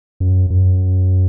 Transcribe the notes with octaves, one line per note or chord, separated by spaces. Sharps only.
F#2
F#2